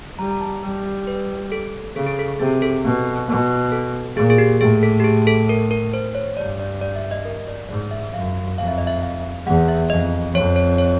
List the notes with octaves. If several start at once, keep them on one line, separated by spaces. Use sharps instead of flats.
G3 A#5
A#5
A5
G3
B4
A4
C#3 A4
G#4
A4
C3 G#4
A4
B2
B2
A4
A#2 G#4
G#4
G4
A2 G#4
A4
G4
G#4
A4
A#4
A#4
C5
C#5
G2 D5
D5
D5
E5
D#5
A#4
D5
G#2 D5
E5
F#2 F5
F2 F5
E5
D#5
E5
F5
E2 F#5
E5
F2 D#5
F2 C#5
C#5
C#5